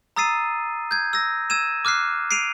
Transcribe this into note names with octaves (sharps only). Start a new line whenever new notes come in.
A#5 D#6 E6 A6 C7 D#7
G6 G#6
E6 A#6
E6 G#6 D#7 E7
D6 F6 F#6 C7
C7 D7 D#7 F7